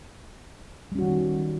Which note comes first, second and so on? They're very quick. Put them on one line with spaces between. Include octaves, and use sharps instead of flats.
G3 C#4 F#4 D#3